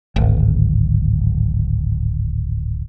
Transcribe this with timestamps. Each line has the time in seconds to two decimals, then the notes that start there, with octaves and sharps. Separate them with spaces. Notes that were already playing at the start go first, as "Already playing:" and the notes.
0.16 D1 G#1